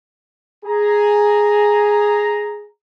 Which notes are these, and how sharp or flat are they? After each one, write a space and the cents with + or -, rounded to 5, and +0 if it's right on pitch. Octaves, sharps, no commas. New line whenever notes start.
G#4 +0 A#5 +0